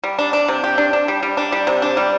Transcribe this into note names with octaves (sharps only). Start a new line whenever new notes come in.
G3
D4
D4
C3
G4
D4
D4
G3
G3
D4
G3
C3
D4
G3